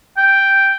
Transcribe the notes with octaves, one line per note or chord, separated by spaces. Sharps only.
G5